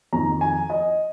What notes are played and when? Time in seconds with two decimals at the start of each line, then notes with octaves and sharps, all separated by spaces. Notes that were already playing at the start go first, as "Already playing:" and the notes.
0.13 F2 D#3 A#5
0.41 G#5
0.70 D#5